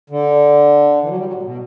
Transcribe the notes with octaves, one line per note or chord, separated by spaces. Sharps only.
D3
E3
F#3
G3
F#3
A2
B2